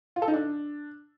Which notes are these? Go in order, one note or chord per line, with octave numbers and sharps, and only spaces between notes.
F4
A4
D#4
D4